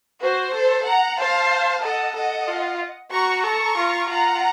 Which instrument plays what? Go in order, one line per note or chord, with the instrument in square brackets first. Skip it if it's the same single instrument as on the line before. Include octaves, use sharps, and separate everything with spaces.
[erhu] F#4 [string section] C5
[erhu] A4
[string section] F#5 A#5
[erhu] C5 [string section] F5 A5
[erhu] A4 [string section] D#5 F#5
[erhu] A4 [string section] D#5 F#5
[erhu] F4
[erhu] F#4 [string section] A#5 C#6
[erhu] A4 [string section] A#5 C#6
[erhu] F4
[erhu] F4 [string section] F#5 A#5